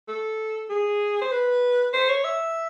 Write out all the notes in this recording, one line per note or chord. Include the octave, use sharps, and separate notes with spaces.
A4
G#4
C5
B4
C5
C#5
E5